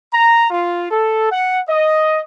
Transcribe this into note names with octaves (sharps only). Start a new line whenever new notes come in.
A#5
F4
A4
F#5
D#5